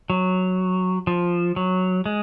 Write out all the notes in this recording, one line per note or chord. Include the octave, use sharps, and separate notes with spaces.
F#3
F3
F#3
G#3